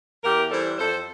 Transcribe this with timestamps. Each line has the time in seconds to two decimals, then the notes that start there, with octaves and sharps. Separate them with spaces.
0.24 E2 G4 A#4
0.51 E3 G3 A4 C5
0.78 F2 A4 C5